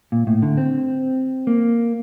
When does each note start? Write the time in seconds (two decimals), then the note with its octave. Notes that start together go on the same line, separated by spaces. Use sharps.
0.12 A#2
0.27 A2
0.42 D3
0.57 C4
1.47 A#3